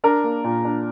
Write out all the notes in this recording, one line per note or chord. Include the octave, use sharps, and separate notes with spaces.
D4 A#4
A#3
A#2
D4